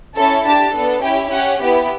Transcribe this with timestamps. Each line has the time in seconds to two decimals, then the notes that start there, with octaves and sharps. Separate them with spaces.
0.16 C#4 E4 A4 A5
0.45 D4 G4 A5
0.73 B3 D4 A4
1.02 C#4 E4 G4 G5
1.31 C#4 G4 F#5
1.59 B3 E4 G4